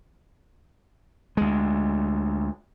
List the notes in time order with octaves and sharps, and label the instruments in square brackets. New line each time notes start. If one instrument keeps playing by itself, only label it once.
[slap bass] D2 G#3